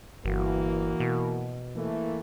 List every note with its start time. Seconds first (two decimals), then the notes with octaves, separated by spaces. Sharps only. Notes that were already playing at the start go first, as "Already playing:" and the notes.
0.25 G1 E3 A#3 F#4
1.00 B2
1.75 E3 A3 A#3